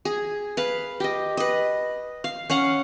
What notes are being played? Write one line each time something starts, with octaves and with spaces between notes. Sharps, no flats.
G#4
B4 F5
G4 D#5
B4 D#5
F5
C#4 F5 F#5